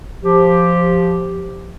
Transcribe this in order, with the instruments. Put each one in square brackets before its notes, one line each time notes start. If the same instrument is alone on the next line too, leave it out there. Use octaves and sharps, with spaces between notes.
[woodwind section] F3 G4